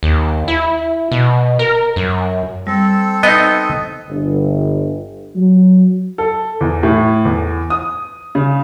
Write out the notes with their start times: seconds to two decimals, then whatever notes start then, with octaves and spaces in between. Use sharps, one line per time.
0.03 D#2
0.48 E4
1.12 B2
1.59 A#4
1.96 F#2
2.67 G3 C4 A4
3.23 B3 D#4 D#5
4.10 G1
5.36 F#3
6.18 A4
6.61 E2
6.83 A2
7.25 E2
7.70 D#6
8.35 C#3